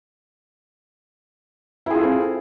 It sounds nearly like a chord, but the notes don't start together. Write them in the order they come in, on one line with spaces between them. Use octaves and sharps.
E4 G#4 F4 A4 C4